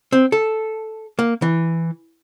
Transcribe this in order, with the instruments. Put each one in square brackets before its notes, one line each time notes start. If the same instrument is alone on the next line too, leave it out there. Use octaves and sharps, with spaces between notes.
[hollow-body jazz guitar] C4
A4
A#3
E3